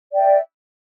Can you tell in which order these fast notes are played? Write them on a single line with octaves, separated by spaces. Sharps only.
D5 G5 E5